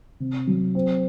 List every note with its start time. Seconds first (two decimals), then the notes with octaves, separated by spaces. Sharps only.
0.20 C3
0.47 F#3
0.75 C4